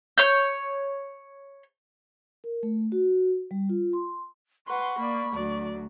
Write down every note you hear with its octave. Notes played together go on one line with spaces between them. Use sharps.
C#5 G6
A#4
A3
F#4
G3
F4
C6
B4 F#5 C6 C#6
A#3 D5 B5
D2 F#3 D5